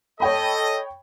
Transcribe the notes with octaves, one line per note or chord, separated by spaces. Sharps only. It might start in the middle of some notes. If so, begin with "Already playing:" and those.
A4 C#5 D#5 G5 B5